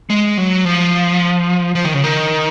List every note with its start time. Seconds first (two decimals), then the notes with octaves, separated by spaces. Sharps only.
0.10 G#3
0.37 F#3
0.65 F3
1.75 F3
1.85 D#3
1.94 C#3
2.04 D#3